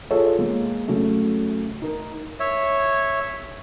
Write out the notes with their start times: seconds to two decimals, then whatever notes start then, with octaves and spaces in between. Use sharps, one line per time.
0.11 F4 G#4 A4 C#5
0.39 G#3 A#3
0.88 C#3 F#3 A3
1.82 D#4 A#4
2.40 C#5 E5